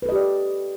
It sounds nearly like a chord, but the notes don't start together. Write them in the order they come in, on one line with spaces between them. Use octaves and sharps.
B4 A4 D#5 G4 D5